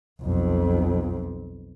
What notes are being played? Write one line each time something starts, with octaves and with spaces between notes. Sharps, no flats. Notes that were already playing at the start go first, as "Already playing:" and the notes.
B1 F2